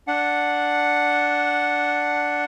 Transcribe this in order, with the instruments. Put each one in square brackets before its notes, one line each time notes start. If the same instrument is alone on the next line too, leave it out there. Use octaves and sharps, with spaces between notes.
[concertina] D4 F#5